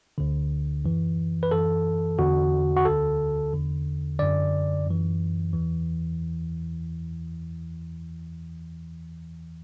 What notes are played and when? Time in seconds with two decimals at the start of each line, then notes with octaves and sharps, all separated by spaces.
0.18 D2 D3
0.84 F#2 E3
1.43 B4
1.51 F#2 E3 A4
2.18 E2 D3 F#4
2.76 F#4
2.85 D2 D3 A4
3.53 E2 D3
4.19 F#2 D3 D5
4.86 F#2 E3
5.53 E2 E3